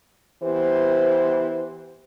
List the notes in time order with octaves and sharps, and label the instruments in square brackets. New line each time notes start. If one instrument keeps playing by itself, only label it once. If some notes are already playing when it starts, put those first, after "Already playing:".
[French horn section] E3 B3 G4 C5